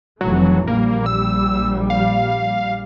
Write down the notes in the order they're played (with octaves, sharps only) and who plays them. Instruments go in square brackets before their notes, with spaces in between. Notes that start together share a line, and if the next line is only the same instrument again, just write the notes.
[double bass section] F1 E3 A3 [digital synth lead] F#3
[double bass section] A#1 G3 [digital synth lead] A#3
[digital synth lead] E6
F5